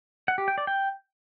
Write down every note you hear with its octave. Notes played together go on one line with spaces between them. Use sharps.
F#5
G4
G5
D5
G5